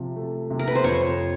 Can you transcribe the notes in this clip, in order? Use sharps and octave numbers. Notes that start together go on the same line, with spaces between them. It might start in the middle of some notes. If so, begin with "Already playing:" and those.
Already playing: C3 F3
A3
C3
A#4
B4
C5
F2 C#5